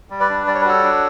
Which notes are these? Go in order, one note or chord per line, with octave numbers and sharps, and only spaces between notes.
G3
B4 D5
D4
G3 D5
C#5
B4
F#4 A4 C#5
D4